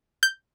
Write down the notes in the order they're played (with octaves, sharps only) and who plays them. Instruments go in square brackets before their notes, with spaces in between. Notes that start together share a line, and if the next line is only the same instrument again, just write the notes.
[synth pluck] G6